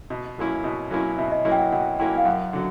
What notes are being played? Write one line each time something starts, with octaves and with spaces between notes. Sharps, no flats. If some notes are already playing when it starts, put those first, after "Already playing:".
B2
F#3 A#3 C#4 E4
B2
F#3 A#3 C#4 E4
B2 E5
D#5
F#3 A#3 C#4 E4
G5
F#5
B2 F#5
F#3 A#3 C#4 E4 G5
F5
F#2 F#5
D3 F#3